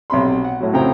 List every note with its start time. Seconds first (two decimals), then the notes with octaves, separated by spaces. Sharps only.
0.10 B1 C3 B5 C6
0.44 F#5
0.60 A2 F#3
0.73 F2 C#3 E4 C5 G5 A#5